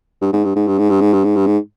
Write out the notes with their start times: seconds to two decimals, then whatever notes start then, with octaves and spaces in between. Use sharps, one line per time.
0.21 G2
0.33 G#2
0.45 G2
0.56 G#2
0.67 G2
0.79 G#2
0.90 G2
1.01 G#2
1.13 G2
1.24 G#2
1.36 G2
1.46 G#2